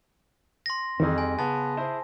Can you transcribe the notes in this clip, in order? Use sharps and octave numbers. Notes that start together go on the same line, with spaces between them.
C6 A#6
F2 D#3 E3 G3 D#4 G#4
G#5
C#3 B3 A5
E4 G#4 C5